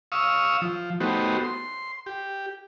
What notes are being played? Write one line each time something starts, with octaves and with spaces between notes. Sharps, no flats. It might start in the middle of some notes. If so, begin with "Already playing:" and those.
F5 C#6 D#6 E6
F3
A3 B3 D#4 F#4 G4 C5
C6
G4